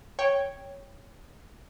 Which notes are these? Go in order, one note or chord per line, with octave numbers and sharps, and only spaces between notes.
C#5 G5